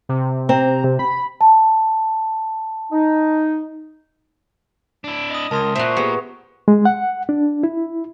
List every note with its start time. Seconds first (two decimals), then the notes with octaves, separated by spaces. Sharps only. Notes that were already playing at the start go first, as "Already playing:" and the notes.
0.09 C3
0.49 C4 A#5
0.84 C3
0.99 B5
1.41 A5
2.92 D#4
5.04 D4 E4
5.30 D#5 D#6
5.51 C#2 A#4 A5 C6 D#6
5.75 A#2 F#4 C5 E5
5.97 B3 G4 G#4
6.68 G#3
6.85 F#5
7.29 D4
7.63 E4